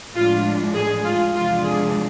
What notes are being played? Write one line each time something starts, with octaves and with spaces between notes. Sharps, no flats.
A2 F3 G#3 D4 F4
G#4
F4
E2 C3 F3 G#3 D4 F4
G#4